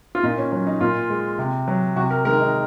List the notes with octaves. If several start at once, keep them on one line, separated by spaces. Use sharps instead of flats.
F4
A#2 D#4
C#4
F#3 C#4
D#4
A#2 F4
G#3
C3
F#3
C3 F#4
A#4
D#3 G#3 A#4
D#4